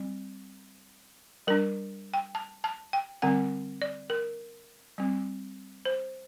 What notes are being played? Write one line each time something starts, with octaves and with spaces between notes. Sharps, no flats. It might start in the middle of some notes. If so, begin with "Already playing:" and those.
Already playing: G3 C4
G3 D4 A#4
G5
A5
A5
G5
D3 G3 C4 F#5
D5
A#4
G3 C4
C5